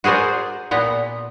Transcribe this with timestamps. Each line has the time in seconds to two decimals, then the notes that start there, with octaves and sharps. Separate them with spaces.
0.04 F#4 G#4 A#4 C5 D5
0.71 A#2 B3 A#5